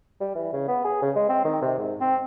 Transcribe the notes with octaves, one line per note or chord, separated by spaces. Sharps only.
G3
E3
C#3
B3
G#4
C#3
G#3
C4
D#3
C3
G#2
C4